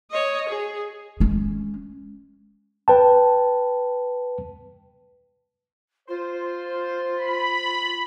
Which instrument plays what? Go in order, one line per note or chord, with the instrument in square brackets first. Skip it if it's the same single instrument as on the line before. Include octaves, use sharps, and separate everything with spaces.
[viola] C#5 D#5
G#4
[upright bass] G#3 C#4
[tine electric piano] B4 G5 A5
[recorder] F4 [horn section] C5
[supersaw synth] B5